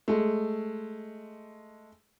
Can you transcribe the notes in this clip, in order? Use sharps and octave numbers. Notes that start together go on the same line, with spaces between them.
G#3 A3